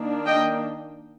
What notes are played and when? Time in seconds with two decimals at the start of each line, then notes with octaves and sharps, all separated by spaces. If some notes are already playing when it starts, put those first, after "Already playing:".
Already playing: D#3 A#3 D4
0.26 D#5 G5